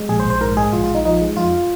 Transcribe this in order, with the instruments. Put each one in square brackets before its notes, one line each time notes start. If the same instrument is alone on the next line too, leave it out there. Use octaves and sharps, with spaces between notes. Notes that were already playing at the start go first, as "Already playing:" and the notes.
Already playing: [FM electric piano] G#3
A#1 G#4
C5
A#1
C5
G#2 A#4
G#3 G#4
A#1 F4
F4
A#1
D#4
F3 D#4
G#3
F2 F4